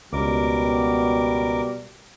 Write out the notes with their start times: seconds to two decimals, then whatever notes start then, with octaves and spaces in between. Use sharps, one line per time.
0.13 C#2 B2 G3 A#4 D6